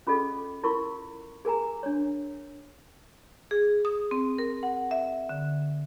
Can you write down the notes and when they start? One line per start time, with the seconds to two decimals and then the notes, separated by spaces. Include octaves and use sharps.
0.07 C#4 F4 G#4 A4 D#5
0.63 E4 F4 A#4 C6 C#6
1.45 G#4 A#4 G#5 A#5
1.83 D4 C#5
3.51 G#4
3.85 D#6
4.11 C4
4.38 A#4
4.63 F#5
4.91 E5
5.29 D3